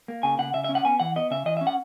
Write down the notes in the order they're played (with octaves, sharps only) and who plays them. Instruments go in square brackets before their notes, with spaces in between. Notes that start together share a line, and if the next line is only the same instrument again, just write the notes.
[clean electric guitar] A#3
C#3 G#5
C#3 F#5
C#3 E5
E5
C#4
F#5
B3 G#5
E3 F#5
B3 D#5
C#3 E5
E3 D#5
E5
C#4
F#5